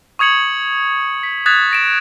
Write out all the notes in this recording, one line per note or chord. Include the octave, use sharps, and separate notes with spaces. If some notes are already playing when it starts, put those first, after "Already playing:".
C#6 D#6 G#6 C#7 F#7
B6
D#6 F#6 G#6 A6 B6 E7
A#6 D7 E7